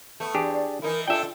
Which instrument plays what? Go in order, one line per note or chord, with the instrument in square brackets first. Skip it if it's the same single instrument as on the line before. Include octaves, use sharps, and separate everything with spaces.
[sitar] A3 B3
[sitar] E2 [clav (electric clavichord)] D4 G4 G#4
[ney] D5
[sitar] E3 D#4 E4 [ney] A#4
[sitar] D4 G4 A4 [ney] F4 [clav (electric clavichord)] E5 G5